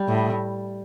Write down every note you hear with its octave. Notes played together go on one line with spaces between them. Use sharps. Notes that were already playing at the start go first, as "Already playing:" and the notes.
Already playing: G3
A2